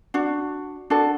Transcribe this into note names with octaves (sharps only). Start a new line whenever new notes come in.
D4 F#4
D4 F#4 A4